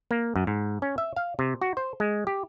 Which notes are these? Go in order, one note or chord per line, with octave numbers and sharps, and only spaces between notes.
A#3
F#2
G#2
C#4
E5
F5
C3
F#4
C5
G#3
G4